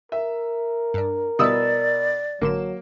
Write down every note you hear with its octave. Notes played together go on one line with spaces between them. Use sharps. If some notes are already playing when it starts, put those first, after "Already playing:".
A#4 E5
G2 D4
B2 G3 E4 B4 D5 D#6 E6
A1 D3 F#3 A#3 E7